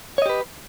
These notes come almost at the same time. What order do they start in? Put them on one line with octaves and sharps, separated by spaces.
C#5 D#5 G4 B4